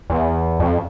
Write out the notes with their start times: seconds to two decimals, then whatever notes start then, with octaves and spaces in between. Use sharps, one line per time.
0.10 E2
0.60 F2